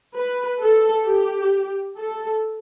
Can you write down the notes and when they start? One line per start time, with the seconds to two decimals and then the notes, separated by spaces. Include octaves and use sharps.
0.16 B4
0.62 A4
1.07 G4
1.98 A4